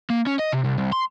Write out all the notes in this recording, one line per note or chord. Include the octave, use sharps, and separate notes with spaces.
A#3
C#4
D#5
C3
C2
C2
C6